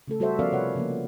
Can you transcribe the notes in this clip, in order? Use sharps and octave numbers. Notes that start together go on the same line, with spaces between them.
C#3 A3 A4
G3 F#4 A4 C5 E5
F3 B3 C#4 A#4 D5 F5
C3 B4 C#5 F#5
C#3 F3 A#3